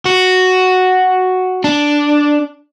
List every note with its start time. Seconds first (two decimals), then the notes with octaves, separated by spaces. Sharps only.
0.06 F#4
1.64 D4